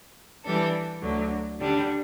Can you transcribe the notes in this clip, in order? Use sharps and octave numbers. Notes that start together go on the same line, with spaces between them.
E3 G3 D4 A4
D2 D3 F#3
D3 G3 D4